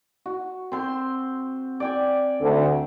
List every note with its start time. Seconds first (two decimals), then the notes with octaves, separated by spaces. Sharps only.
0.26 F#4
0.72 C4 C6
1.80 D5 G5 G#5
2.41 D2 D3